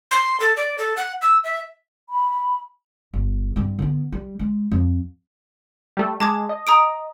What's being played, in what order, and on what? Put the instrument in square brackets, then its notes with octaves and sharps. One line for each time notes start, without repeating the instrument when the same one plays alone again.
[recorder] C6
A4
D5
A4
F#5
E6
E5
[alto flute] B5
[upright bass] G1
G2 C4
D3 B3
G3
G#3
F2
[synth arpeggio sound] G3 A3
[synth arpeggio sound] G#3 [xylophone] A5 D6 G#6
[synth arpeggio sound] D#5
[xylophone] A#5 D#6 D7